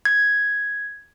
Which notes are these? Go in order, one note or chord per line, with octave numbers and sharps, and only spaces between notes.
G#6